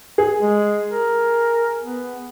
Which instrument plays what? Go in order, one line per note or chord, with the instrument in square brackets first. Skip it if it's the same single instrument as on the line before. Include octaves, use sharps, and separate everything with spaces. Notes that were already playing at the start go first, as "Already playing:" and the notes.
[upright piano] G#4
[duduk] G#3
A#4
B3